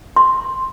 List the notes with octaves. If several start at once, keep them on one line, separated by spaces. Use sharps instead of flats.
C6